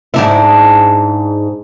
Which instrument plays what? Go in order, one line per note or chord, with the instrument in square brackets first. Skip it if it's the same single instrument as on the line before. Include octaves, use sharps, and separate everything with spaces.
[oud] G#2 D4 E4